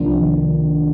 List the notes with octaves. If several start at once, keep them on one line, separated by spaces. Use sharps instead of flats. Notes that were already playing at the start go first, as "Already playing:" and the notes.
Already playing: C2 C3 F3 A#3 D4
D#3